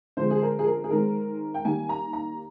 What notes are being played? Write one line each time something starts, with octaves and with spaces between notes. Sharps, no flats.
D3 F3 G#3 C4 C5
G#4
A#4
G#4
A#4
G#4
D#3 G#3 C4 A#4
G5
D#3 G3 A#3 G#5
A#5
A#5